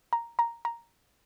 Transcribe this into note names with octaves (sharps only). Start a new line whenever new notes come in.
A#5
A#5
A#5